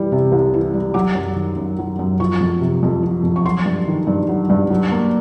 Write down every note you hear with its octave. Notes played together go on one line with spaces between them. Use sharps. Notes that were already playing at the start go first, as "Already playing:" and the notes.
Already playing: E3 G3
C3
C2
E3
G3
F#3 D6
F#2
D#3
F#2
F#3
F#2
F3 C#6
F2
C3
F2
F3
F2
C#6
F#3 C6
G2
D#3
G2
F#3
G2
F#3
A#3